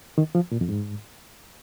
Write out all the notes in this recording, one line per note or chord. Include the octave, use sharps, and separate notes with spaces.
D#3
F3
A#2
F2
G#2